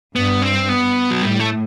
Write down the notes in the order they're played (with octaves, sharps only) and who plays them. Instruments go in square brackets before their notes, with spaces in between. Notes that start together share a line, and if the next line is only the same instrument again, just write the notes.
[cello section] G2 [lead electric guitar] B3
[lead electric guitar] C4
B3
F#3
[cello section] A2 [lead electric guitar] G3
[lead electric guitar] A3